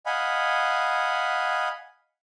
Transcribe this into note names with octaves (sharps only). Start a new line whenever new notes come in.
D#5 F5 F#5 G#5 B5